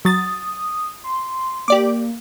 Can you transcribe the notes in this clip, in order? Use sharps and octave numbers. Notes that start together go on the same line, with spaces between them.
F#3 D#6 A6
C6
A#3 G4 D5 D6